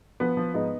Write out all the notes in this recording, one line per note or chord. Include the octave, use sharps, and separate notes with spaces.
F3 B3
F3
G#2 B3 D#4